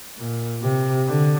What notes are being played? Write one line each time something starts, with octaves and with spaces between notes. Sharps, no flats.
A#2
C3
D3